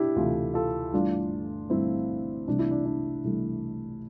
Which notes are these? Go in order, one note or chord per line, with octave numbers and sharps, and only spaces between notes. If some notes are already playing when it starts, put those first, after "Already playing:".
Already playing: D4 E4 G4
D2 C3 E3 F4 A4
F4 A4
G1 G2 E3 A3 D4 F4
G1 G2 E3 A3 C4 E4
C2 C3 E3 A3 D4
E4
D4
D4
C2 C3 E3 A3